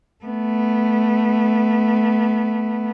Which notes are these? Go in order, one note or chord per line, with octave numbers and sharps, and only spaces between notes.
A3 B3